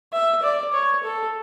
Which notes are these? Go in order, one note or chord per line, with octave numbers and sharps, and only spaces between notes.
E5
D5
C#5
A4